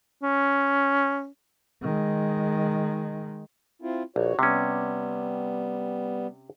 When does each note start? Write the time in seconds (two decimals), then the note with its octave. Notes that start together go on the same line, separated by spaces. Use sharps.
0.23 C#4
1.82 D#3 G#3
3.82 C4 E4 F4
4.16 A#1 F#4 C#5
4.39 C3 G3 B3 C#4